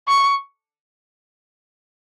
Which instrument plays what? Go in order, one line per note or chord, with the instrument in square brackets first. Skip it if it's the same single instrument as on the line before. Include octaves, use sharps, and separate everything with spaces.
[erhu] C#6